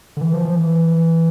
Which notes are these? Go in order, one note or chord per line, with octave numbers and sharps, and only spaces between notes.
D3
E3
F3
F3
E3